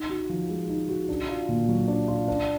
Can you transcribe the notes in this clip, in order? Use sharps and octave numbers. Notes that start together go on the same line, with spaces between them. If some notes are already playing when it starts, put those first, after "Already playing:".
Already playing: D#4
F#4
F3
G#3
D#4
F#4
D4
F4
A#2
F#3
D4
F4
D4